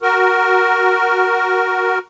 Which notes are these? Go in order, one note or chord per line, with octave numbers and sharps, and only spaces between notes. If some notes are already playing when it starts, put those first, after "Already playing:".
F#4 A#4